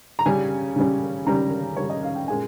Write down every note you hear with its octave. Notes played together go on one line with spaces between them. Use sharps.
A#5
C#3 G3 C#4 G#5
C#3 G3 C#4
C#3 G3 C#4 A#5
C#3 G3 C#4 C#5
D#5
F5
G5
A#2 G#3 C#4 G#5